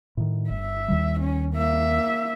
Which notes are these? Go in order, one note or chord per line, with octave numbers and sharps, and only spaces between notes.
A2 D#3
G1 E5
D#2 D#3 G3
C#4
A#3 E5